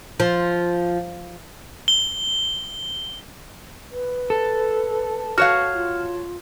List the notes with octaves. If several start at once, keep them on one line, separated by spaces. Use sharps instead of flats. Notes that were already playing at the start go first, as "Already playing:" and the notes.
F3
G7
B4
A4
F#4 C#5 F5 F6
F4